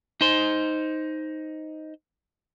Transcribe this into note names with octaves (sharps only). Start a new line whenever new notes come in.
D#4 C5